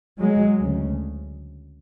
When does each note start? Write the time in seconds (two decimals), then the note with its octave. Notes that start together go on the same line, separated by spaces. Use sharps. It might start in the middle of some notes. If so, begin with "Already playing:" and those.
0.19 F#3 G#3
0.58 D2 C#3